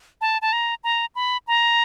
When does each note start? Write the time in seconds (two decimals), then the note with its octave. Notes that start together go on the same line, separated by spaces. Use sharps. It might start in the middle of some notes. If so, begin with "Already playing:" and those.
0.21 A5
0.42 A5
0.53 A#5
0.84 A#5
1.15 B5
1.47 A#5